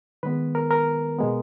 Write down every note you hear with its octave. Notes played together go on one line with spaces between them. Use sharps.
D#3 G#3 B3 B4
A#4
A#4
B2 G#3 B3